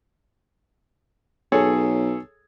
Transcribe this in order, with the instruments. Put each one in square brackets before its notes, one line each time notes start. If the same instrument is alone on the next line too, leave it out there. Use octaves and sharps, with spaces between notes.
[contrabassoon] B1 [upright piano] G#4 A4 C#5